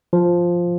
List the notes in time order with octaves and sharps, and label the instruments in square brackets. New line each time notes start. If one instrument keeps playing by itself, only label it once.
[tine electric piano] F3